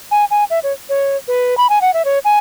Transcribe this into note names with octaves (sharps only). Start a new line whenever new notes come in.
G#5
G#5
E5
C#5
C#5
B4
B5
G#5
F#5
E5
C#5
G#5